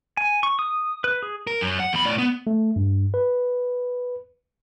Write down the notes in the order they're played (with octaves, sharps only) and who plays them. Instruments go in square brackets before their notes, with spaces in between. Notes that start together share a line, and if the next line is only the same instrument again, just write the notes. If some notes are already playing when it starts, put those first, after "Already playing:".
[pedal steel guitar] G#5
C#6
D#6
B4
G#4
[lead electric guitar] A#4
F#2
F#5
E2 B5
A2 D5
B3
[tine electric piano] A3
G2
B4